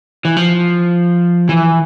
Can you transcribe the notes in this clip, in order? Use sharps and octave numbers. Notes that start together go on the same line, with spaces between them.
E3
F3
E3